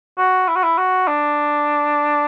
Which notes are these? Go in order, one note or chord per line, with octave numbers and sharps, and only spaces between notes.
F#4
E4
F#4
E4
F#4
D4